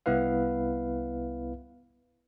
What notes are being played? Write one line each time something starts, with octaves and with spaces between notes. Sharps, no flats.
C2 B3 E4 B4 F5